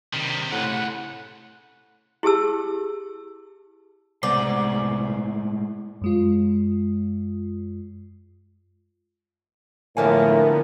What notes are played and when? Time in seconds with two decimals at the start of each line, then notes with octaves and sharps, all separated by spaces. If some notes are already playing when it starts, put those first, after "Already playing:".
0.13 C3 D#3 G3
0.52 A2 C#3 B4 F#5
2.23 E4 G4 G#4 A5 E6
4.23 C2 A2 G#3 B3 C5 D5
6.02 F#2 G#3 F4
9.97 F#2 A2 D3 F3 A#3 B3 A#4 G#5